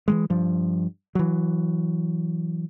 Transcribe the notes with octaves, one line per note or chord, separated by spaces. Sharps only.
E3 G3 G#3
G2 F3
E3 F#3